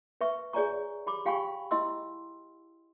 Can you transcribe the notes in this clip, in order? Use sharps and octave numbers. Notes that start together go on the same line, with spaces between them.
B4 E5 C#6
G#4 C#5 D5 G#5 A#5 C#6
G4 B5 D6
G4 F5 G5 G#5 B5 C#6
E4 D#5 C6 E6